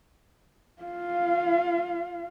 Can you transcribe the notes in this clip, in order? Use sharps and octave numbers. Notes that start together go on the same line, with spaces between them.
F4 F5